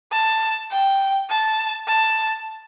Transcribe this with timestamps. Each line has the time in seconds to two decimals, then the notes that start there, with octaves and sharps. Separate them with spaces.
0.12 A5
0.71 G5
1.30 A5
1.88 A5